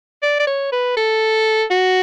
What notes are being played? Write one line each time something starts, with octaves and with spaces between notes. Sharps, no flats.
D5
D5
C#5
B4
A4
F#4